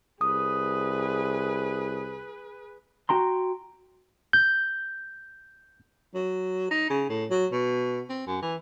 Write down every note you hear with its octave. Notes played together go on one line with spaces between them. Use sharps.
C2 G#4 B4 D#6
F#4 G5 A#5 C6
G6
F#3
D#4
C#3
A2
F#3
B2
C4
F#2
E3